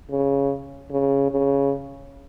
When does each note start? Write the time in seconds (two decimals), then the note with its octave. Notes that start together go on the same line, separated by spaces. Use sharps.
0.11 C#3
0.91 C#3
1.31 C#3